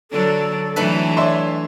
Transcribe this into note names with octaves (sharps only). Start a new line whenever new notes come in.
D3 F#3 D4 A4
E3 F#3 A3 D4 B4
C#5 D5 E5 C6